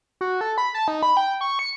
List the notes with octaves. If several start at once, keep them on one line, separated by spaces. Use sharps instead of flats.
F#4
A4
B5
A5
D#4
B5
G5
C#6
C#7